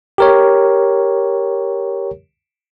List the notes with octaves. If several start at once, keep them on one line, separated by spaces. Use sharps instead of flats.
G4 A#4 C#5